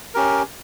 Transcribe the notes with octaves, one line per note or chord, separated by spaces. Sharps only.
C#4 G4 A#4